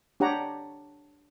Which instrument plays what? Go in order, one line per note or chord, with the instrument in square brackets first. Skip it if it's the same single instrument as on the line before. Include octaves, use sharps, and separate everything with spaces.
[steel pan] D4 G4 C#5 F#5 A#5